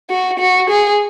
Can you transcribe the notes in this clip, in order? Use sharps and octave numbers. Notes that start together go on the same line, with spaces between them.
F#4
F#4
G#4